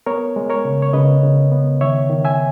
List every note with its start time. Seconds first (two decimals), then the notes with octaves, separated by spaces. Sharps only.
0.06 B3 A#4 C#5
0.36 G#3
0.50 A#4 C#5
0.65 C#3
0.82 C#5
0.93 C#3 B4 D#5
1.23 C#3
1.52 B3
1.81 D#3 C#5 E5
2.10 D#3
2.25 E5 G#5